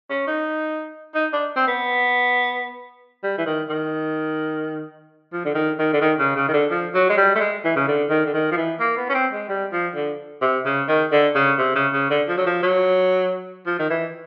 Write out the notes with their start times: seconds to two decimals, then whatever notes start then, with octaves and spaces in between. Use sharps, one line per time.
0.10 C#4
0.27 D#4
1.15 D#4
1.33 D4
1.56 C4
1.68 B3
3.23 G3
3.38 E3
3.46 D#3
3.69 D#3
5.33 F3
5.45 D3
5.55 D#3
5.79 D#3
5.93 D3
6.01 D#3
6.19 C#3
6.36 C#3
6.48 D#3
6.53 D3
6.71 F3
6.95 F#3
7.10 G#3
7.17 G3
7.35 A3
7.40 G#3
7.64 E3
7.76 C#3
7.88 D3
8.10 D#3
8.26 D3
8.34 D#3
8.51 F3
8.57 E3
8.80 A#3
8.97 B3
9.09 C#4
9.15 C4
9.33 G#3
9.49 G3
9.72 F3
9.95 D3
10.42 C3
10.66 C#3
10.88 D#3
11.12 D3
11.35 C#3
11.58 C3
11.75 C#3
11.93 C#3
12.10 D3
12.28 F3
12.37 F#3
12.46 F3
12.63 F#3
13.66 F3
13.79 D#3
13.90 E3